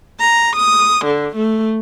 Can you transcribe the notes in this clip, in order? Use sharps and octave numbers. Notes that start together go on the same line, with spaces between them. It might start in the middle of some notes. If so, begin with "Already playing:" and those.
A#5
D#6
D3
A3